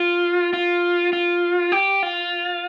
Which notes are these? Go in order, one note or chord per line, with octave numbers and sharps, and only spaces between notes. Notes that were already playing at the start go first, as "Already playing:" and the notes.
Already playing: F4
F4
F4
G4
F4